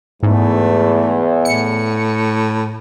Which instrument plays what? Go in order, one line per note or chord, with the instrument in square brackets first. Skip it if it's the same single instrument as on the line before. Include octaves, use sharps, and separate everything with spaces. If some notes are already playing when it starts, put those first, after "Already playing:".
[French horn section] E2 [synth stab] G#2 [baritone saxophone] A3
[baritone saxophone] A2 [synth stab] C#7